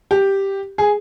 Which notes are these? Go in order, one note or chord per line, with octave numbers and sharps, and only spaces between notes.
G4
G#4